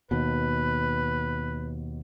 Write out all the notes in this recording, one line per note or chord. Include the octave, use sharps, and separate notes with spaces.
D#2 B2 B4